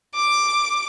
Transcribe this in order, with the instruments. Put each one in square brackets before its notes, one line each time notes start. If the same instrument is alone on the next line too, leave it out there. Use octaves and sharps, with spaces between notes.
[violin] D6